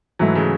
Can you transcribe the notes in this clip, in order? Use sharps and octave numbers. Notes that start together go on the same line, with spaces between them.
G#2 E3 F#3 A3 E4
C#3